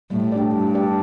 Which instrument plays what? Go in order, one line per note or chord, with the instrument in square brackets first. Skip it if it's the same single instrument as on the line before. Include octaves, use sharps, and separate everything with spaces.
[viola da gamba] A2 [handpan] G3
[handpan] D4 G4 D5
[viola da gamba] G2 [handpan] G3
[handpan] D4 G4 D5